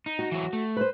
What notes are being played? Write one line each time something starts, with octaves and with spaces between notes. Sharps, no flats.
D#4
F#4
E3 F#3
A3
B4 C5